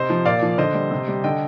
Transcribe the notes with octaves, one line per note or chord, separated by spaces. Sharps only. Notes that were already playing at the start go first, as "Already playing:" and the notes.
Already playing: C3 C5 D#5
F3
A#2 D5 F5
F3
D3 C5 D#5
G3
C3
G3
D3 D#5 G5